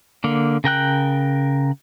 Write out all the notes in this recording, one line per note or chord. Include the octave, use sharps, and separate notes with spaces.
D3 A#3
C#3 A#4 G5 F#6